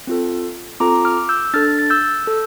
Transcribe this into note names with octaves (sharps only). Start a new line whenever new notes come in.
C4 F4 A4
C4 F4 A4 A#5 D6
D6 F6
E6 G6
D4 A4 F6 A6
A6
E6 G6
A4